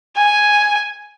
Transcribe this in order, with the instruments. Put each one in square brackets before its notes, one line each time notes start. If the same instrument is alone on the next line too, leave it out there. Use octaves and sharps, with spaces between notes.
[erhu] G#5